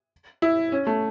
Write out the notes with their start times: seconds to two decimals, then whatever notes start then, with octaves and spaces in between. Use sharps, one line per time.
0.42 E4
0.72 C#4
0.87 A3